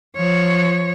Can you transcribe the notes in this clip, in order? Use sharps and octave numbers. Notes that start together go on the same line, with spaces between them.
F3 C#5